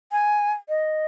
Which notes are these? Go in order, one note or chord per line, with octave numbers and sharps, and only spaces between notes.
G#5
D#5